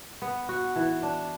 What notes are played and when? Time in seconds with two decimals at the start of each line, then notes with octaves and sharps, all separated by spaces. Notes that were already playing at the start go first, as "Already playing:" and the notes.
0.22 B3
0.49 F#4
0.76 E3
1.02 D4